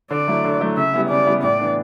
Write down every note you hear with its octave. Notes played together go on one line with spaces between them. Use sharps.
D3 D5
F#3 A3 E4
D3
F#3 A3 E4
C#3 E5
G3 B3 E4
C#3 D5
G3 B3 E4
A2 D5
E3 B3 D4